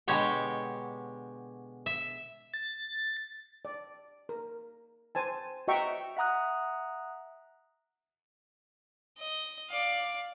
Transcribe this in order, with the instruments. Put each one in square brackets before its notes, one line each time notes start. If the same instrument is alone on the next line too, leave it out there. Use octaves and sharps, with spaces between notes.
[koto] B2 D3 G#3 G4 C#5 G5
E5
[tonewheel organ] A6
[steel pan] D5
A#4
C5 G#5 A5
F#4 D#5 E5 G5 A#5 C#6
[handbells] E5 F#5 A#5 D#6 F#6
[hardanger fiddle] D#5
D5 F5